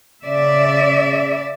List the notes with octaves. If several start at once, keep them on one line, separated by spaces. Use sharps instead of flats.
C#3 D5 E5